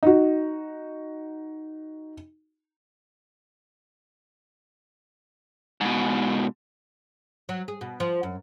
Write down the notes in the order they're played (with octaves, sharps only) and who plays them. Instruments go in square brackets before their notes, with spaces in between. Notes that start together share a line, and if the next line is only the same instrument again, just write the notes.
[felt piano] D#4 F#4
[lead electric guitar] G#2 B2
[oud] F#3
G#4
B2
F3
F#2